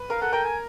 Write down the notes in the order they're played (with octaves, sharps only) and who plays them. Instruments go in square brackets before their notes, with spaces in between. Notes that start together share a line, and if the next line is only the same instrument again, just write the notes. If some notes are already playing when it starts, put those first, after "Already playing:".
Already playing: [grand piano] B4
[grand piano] A#4 [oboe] F5
[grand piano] A4 [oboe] F#5
[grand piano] A#4 [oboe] G5
[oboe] G#5